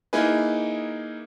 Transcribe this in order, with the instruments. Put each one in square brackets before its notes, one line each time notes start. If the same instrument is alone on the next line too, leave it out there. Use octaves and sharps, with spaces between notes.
[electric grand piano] A#3 D#4 E4 G#4 B4